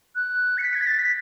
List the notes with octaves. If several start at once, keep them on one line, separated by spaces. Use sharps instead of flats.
F#6
C#7
B6
G#6
B6
A6
B6